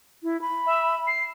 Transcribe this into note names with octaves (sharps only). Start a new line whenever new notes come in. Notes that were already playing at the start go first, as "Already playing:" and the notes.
E4
B5
E5
C7